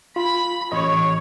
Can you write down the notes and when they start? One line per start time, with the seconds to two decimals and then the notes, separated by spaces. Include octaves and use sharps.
0.16 F4 B5
0.72 A1 C#5 D#5